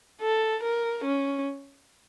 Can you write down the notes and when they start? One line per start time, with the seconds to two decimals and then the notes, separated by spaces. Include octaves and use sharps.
0.21 A4
0.63 A#4
1.04 C#4